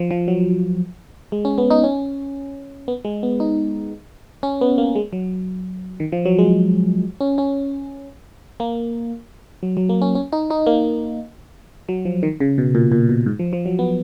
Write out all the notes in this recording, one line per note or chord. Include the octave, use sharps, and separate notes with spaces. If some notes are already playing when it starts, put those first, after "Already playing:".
Already playing: F3
F3
F#3
G#3
C#4
B3
D#4
C#4
B3
G#3
B3
D#4
C#4
B3
A#3
G#3
F#3
D#3
F3
F#3
G#3
C#4
C#4
A#3
F#3
F#3
A#3
C#4
C#4
D#4
D#4
A#3
F#3
F3
D#3
C#3
B2
A#2
A#2
B2
G#2
F3
F3
F#3
B3